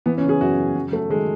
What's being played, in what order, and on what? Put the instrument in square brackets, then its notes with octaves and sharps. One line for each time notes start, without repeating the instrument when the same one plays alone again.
[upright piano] E3 B3
C#4
C#3
G#4
F#2 F#4
C#3
F#3 F#4
F#3 A3
D#3 G#3